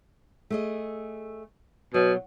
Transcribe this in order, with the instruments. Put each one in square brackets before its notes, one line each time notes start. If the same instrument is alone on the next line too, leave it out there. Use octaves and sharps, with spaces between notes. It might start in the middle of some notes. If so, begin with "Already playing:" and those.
[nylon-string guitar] A3 G#4 D#5
[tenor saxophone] B2 [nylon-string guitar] F#3